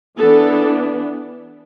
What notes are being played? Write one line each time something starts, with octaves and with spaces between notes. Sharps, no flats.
E3 B3 D4 A4